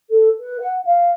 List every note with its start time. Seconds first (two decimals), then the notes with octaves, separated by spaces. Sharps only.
0.10 A4
0.39 B4
0.59 F#5
0.84 F5